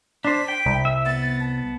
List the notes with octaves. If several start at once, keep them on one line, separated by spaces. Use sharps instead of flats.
D4 C5 B6
G5
C2
E5
B3 A6
A5